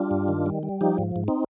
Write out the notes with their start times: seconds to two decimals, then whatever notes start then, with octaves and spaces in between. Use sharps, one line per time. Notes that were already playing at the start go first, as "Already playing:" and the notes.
Already playing: G3 D4 F4
0.11 G2
0.28 D#3
0.46 G3
0.63 G3
0.81 F3 D#4 G4
0.98 G#2
1.16 G#2
1.28 C4 D#4